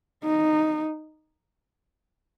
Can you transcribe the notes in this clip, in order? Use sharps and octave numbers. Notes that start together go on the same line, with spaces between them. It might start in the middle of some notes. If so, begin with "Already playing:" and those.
D#4